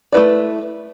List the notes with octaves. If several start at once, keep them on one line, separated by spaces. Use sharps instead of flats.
A3 E4 B4 D5